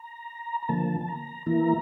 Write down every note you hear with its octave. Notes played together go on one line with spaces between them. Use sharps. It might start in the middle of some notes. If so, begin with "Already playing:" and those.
Already playing: A#5
A#5
D3 F3 A#3 A5
A5
A#5
E3 A#3 E4 A#5